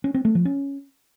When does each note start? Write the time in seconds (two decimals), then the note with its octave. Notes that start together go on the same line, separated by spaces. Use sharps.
0.04 C#4
0.14 C4
0.25 A3
0.35 F3
0.45 C#4